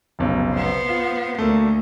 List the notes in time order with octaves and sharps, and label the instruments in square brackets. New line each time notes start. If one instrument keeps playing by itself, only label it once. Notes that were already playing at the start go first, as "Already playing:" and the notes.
[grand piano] F1 B1 C#3
[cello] B3 C5
[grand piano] F4
[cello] D2 [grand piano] A3 A#3